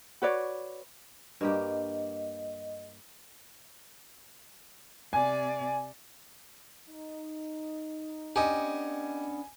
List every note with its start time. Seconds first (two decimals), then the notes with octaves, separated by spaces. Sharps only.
0.22 F#4 B4 C#5 D5
1.41 G2 A#3 G4 D#5
5.13 C3 D5 G#5
6.87 D#4
8.36 B3 C#4 D4 G4 D#5 G#5